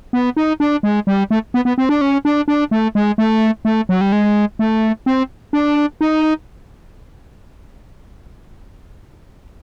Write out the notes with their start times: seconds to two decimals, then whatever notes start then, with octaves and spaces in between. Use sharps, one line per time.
0.13 B3
0.37 D#4
0.60 D4
0.83 G#3
1.07 G3
1.31 A3
1.54 B3
1.65 B3
1.78 C4
1.89 D4
2.01 C#4
2.25 D4
2.48 D4
2.71 A3
2.95 G#3
3.18 A3
3.65 A3
3.89 F#3
4.01 G3
4.12 G#3
4.59 A3
5.06 C4
5.53 D4
6.01 D#4